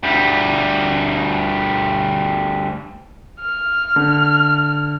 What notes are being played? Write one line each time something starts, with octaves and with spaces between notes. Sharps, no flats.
D2 G3
F6
D3